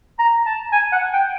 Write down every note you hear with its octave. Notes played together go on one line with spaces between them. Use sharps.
A#5
A5
G#5
F#5
G5